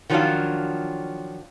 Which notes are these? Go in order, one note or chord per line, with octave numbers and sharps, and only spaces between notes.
D#3 F3 F#3 C#4 D4 F4